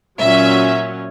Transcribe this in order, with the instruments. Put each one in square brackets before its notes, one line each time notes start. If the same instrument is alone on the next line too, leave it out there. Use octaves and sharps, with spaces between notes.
[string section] A#2 F#3 C#4 E5